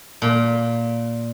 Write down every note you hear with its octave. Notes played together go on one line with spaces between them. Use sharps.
A#2